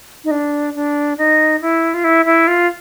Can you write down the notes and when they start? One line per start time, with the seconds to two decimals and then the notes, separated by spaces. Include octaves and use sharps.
0.24 D#4
0.31 D4
0.75 D4
1.17 D#4
1.61 E4
1.94 F4
2.04 E4
2.25 E4
2.48 F4